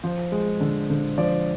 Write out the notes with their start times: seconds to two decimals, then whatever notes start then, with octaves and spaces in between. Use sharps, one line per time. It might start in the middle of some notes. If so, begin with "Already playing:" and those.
0.04 F3 C5
0.32 G#3
0.60 D3
0.90 D3
1.18 F3 D5